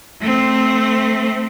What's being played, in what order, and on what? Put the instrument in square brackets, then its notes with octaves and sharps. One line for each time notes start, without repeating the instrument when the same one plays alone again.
[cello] A3 C4